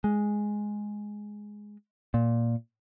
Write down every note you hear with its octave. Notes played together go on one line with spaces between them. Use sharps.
G#3
A#2